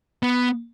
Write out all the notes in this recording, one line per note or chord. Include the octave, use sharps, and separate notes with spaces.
B3